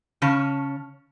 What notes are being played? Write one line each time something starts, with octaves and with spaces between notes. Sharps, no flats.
C#3 C#4 A5